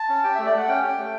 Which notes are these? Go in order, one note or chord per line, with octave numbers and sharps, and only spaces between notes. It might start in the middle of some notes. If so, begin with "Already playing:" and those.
Already playing: A5
C#4
G4 G5
A3 E5
D5
A3 F#5
C#4 G5
G4
A3